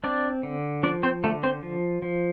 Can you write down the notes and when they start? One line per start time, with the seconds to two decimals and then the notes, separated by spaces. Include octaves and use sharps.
0.04 C4 D4 D5
0.43 D3
0.83 F3 D4 D5
1.03 C4 C5
1.24 D3 A3 A4
1.43 C4 C5
1.63 F3
2.02 F3